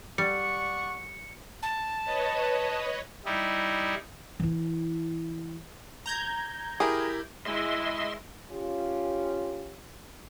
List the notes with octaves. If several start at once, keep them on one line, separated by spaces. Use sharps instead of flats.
G3 D5 F#5 C#6 C#7
A5
B4 C#5 D#5
G3 D#4 E4
E3 E4
A#5 G6 G#6
E4 G4 G#4 A#4
G#3 E4 D#5 E5 C6
C#4 F4 G4